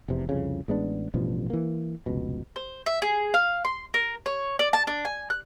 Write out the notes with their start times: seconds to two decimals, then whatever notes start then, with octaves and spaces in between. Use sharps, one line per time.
0.08 F1 E2 C3
0.29 C2 F2 C#3
0.68 A1 G#3 B3 D4
1.14 A1 G2 B2 F3
1.50 E3 A#3
2.06 F1 C#2 B2
2.56 C5
2.86 E5
3.02 G#4
3.34 F5
3.65 C6
3.94 A#4
4.26 C#5
4.59 D5
4.73 A5
4.87 D4
5.05 G#5
5.30 F#6